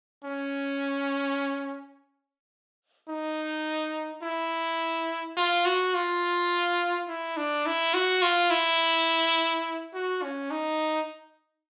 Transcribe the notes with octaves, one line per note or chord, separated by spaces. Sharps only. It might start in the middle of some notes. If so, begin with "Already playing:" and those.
C#4
D#4
E4
F4
F#4
F4
E4
D4
E4
F#4
F4
E4
F#4
C#4
D#4